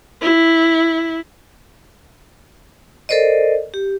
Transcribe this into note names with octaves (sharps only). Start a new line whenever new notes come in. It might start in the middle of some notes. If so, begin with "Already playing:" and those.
E4
A4 A#4 C5 D5 D#5
G4